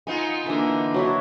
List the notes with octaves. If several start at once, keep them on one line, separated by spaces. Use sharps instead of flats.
B3 D#4 F4 G#5
D3 E3 A#3
F#3 D4 E4